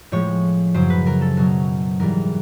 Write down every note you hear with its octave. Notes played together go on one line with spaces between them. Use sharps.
A2 F3 G#3 C#5
F#2 C#3 F#3 C5
B4
A#4
A4
B2 F#3 A#4
G#2 E3 G3 A#4